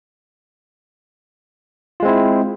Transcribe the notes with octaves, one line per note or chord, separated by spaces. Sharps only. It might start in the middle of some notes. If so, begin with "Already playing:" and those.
G#3 C4 E4 F4